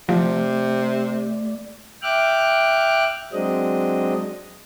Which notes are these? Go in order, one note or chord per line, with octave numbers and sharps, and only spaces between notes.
C3 F3 A3 D5
E5 G5 D6 F6 F#6
F#3 G#3 C4 D4 D#5